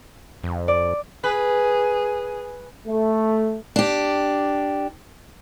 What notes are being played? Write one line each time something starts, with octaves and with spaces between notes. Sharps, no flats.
F2
D5
G#4 B4
A3
D4 G4